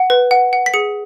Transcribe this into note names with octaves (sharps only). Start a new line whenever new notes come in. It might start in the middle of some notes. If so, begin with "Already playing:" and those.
Already playing: F#5
B4
F#5
F#5
B6
G#4 C#7